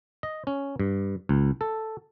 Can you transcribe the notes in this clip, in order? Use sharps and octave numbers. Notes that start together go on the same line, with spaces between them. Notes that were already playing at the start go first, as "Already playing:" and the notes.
D#5
C#4
G2
C#2
A4